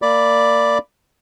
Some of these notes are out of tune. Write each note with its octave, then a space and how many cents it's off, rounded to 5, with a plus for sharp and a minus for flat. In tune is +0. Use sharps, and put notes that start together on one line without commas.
A#3 -25 D5 +0 B5 +0